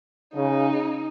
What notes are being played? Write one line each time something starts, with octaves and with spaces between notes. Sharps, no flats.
C#3 D#4